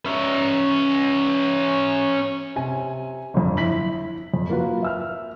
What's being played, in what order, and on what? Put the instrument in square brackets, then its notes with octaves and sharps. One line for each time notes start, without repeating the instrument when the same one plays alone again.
[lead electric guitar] C#4 E5
[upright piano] C3 G#5
G1 F2
E4 B6 F#7
F2
A#3 F4 F#4 B4
E5 E6 F6